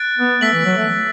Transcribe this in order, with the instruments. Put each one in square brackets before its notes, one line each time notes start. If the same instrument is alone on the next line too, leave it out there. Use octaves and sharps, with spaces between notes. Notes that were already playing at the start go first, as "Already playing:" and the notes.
Already playing: [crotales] F#6 A6 D7
[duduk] B3
[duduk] A3 [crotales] E6 B6 F#7
[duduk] E3
F#3
A3